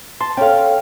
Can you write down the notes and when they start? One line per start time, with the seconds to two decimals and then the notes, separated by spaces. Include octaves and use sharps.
0.21 A5 C6
0.37 C#4 A4 C#5 F5 G5